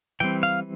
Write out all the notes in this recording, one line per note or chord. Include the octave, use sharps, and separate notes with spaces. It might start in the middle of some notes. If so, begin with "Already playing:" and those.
E3 G3 C4 G5
F5